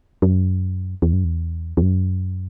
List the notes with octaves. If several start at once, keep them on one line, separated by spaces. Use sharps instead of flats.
F#2
E2
F#2
E2
E2
F#2